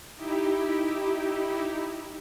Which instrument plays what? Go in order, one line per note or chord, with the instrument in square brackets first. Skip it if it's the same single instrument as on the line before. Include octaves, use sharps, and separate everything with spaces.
[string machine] D#4 E4 G4